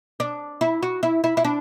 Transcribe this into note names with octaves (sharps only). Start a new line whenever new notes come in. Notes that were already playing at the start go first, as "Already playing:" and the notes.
D4
E4
F#4
E4
E4
E4
D4